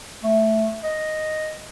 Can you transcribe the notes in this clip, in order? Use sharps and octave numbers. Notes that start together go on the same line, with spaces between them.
A3
D#5